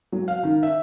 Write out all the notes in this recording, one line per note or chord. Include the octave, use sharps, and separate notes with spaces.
F#3
F5
D#3
E5